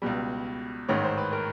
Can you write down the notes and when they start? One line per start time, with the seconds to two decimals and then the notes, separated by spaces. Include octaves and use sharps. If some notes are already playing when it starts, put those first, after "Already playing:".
0.02 C#2 B2 G3
0.88 A1 G#2 D#3 C#5
1.04 C5
1.18 B4
1.33 A#4